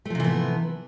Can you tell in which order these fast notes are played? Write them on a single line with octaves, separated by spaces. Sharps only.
A3 F3 C3 E3 B3